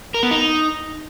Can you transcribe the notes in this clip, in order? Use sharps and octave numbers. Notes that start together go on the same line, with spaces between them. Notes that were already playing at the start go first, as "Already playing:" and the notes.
A#4
B3
D#4